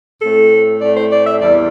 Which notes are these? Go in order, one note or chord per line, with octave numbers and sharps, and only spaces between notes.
A2 A3 C4 A4
A2 A3 C4 D5
C5
D5
E5
E2 E3 G3 D5